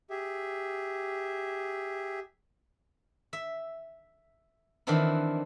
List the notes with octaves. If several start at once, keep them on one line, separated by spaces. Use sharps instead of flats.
G4 G#4 E5
E5
D#3 E3 B3 C4 D4 E4